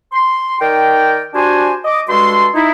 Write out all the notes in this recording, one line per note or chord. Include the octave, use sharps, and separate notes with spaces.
C6
D#3 A#4 D5 G5
D4 F#4 G4 C5 G#5
D#5 D6
G2 G#3 F#4 A4 C6
D#4 E4